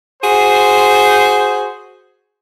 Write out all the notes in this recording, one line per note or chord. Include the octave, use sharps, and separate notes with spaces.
F#4 G#4 C5